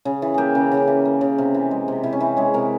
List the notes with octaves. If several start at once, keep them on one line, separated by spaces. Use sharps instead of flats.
C#3 G#4
E3
A#3 G4 G#4
C#3
C#3
E3
A#3
C#3
C3
E3
G#3
C3
C3 E4
C#4
E3 E4
G#3 C#4
C3 A#4